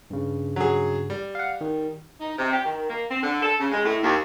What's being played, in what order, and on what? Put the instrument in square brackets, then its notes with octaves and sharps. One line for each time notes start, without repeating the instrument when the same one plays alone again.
[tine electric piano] G2 C#3
[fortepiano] F#3 G#4
G3
[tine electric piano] F5 F#5
D#3
[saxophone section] D#4
C3
G4
D#3
A#3
C4
D3
A4
C#3
G#3
A2
D#2